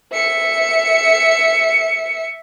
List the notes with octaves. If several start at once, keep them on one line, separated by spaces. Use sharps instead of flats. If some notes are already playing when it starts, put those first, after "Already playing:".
E5 C#7